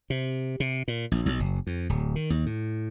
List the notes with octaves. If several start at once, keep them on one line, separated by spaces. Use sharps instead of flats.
C3
C3
A#2
A#1
B1
F#1
F2
D1
D#3
D#2
A2